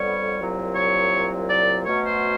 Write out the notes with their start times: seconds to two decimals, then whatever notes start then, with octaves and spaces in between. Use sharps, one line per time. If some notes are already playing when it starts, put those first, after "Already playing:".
Already playing: F2 D3 G3 B3 C#5
0.39 C2 A#2 F#3
0.76 C#5
1.50 D5
1.86 B2 F#3 A3 C#4 C#5
2.05 C5